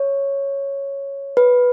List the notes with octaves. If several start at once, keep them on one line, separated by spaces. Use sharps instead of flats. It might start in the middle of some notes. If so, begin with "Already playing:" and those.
Already playing: C#5
B4